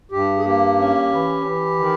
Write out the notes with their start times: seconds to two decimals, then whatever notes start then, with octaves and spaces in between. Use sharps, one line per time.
0.12 G2 G4
0.38 G#4
0.45 A#3 G4
0.79 C#4
1.12 E3
1.46 E3
1.79 D#3